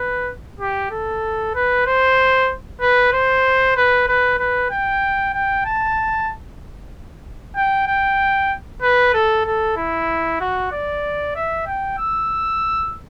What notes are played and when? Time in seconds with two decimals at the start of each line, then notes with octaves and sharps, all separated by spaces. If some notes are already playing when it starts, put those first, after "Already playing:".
Already playing: B4
0.60 G4
0.91 A4
1.55 B4
1.86 C5
2.81 B4
3.13 C5
3.76 B4
4.08 B4
4.39 B4
4.71 G5
5.34 G5
5.65 A5
7.55 G5
7.87 G5
8.82 B4
9.14 A4
9.45 A4
9.76 E4
10.40 F#4
10.72 D5
11.35 E5
11.66 G5
11.98 E6